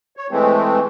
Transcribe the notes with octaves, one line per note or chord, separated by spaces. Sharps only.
C#5
E3 G#3 A3 C4